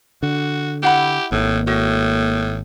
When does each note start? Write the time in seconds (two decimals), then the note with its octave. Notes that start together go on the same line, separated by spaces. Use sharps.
0.23 D3 F#4
0.83 E4 G4 F#5 B5
1.32 G#1 A2 A#3
1.67 A2 F#4